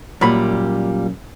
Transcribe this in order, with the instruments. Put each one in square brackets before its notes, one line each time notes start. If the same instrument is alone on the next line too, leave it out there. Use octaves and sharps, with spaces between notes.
[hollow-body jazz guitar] F#2 B5 [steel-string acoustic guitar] A#2 G3